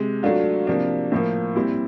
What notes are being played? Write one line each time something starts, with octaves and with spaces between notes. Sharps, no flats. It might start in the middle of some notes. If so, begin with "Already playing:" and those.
Already playing: C3 G#3
F#3 A3 D4 F4
C3 F3 A#3 D4
A2 F3 A#3
A#2 G3 C4 E4